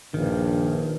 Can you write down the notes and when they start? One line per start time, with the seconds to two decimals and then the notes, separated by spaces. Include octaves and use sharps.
0.14 A#1 G2 D#3